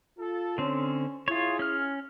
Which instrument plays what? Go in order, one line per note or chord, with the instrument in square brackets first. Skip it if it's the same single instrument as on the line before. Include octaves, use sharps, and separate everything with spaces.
[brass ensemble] F4 A4
[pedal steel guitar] D3 C4 [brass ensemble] C#4
[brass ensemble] E4 G#4 [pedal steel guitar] F4 C#5
[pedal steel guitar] C#4 F6